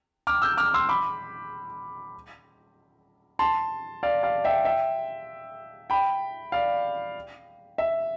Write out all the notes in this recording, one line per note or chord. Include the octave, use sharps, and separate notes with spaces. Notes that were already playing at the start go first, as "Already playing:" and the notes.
D6 F6
E6 G6
D6 F6
C6 E6
B5 D6
A5 C6
D5 F5
D5 F5
E5 G5
E5 G5
G5 B5
D5 F5
E5